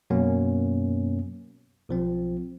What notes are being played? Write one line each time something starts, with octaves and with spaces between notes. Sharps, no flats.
F#2 B2 F#3 A#3 B3 C#4
B1 F3 C4